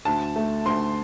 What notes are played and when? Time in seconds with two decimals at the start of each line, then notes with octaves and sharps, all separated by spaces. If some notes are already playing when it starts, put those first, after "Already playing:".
0.05 D2 A5
0.36 A3
0.66 D2 C6